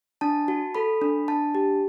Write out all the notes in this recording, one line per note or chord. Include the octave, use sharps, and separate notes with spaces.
D4 A5
F#4
A4 B5
D4
D4 A5
G4